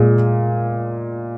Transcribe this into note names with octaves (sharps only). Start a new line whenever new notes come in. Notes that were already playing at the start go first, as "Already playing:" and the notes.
Already playing: A#2 G#3